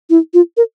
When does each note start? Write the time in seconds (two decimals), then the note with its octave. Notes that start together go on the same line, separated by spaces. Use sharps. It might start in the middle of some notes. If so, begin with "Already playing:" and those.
0.10 E4
0.34 F4
0.57 A#4